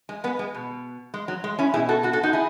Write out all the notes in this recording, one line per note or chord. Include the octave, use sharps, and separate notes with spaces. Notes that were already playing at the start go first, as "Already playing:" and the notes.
G#3
G#3 B3
G#3
B2
G#3
F#3
G#3
C#4 E4
B2 E4 G#4
F#4 A4
F#4 A4
F#4 A4
D#4 F#4
E4 G#4